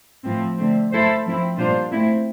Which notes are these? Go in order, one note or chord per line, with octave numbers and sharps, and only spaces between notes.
A2 F3 C4
D3 A3 C4
A3 E4 A4 C5
F3 C4 E4
A#2 G3 D4 F4 C5
A3 C4 E4